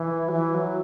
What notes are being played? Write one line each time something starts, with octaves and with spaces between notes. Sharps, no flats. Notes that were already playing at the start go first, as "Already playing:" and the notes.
Already playing: E3
F#3
E3
F#3